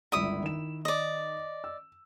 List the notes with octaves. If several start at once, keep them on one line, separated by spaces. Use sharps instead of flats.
G1 C#2 E4 D5 D#6
D#3 E7
D5 D#5
E6